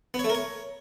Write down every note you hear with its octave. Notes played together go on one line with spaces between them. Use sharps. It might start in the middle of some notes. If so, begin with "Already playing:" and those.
B3
C#5
A3
A#4
C#5